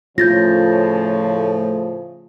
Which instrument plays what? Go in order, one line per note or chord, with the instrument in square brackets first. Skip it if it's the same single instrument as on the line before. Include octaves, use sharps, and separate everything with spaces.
[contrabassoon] A2 [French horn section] C#3 F3 A3 [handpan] F4 [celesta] G6 A6 A#6